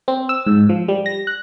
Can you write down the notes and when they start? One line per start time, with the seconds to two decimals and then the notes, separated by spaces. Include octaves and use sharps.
0.08 C4
0.29 E6
0.47 G#2
0.69 F3
0.88 G3
1.06 A#6
1.27 F#6